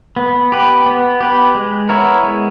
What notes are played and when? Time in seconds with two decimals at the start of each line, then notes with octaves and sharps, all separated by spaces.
0.16 B3
0.52 G4 B4
0.86 B3
1.21 G4 B4
1.55 G#3
1.89 B3 E4 A#4 C#5
2.23 G#3